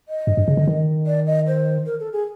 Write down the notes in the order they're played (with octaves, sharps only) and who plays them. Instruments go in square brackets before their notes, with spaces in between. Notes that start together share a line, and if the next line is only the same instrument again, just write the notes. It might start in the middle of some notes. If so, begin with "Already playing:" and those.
[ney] D#5
[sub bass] G2
G2
C#3
D3
D#3
[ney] D5
D#5
C5
A#4
A4
G#4